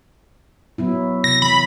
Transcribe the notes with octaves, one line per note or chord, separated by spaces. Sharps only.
F#3 B3 E4
C3 A#6
E3 B5